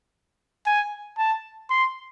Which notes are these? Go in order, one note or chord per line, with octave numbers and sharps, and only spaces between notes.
G#5
A5
C6